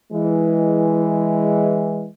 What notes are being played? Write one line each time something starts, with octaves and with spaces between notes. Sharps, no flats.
E3 G#3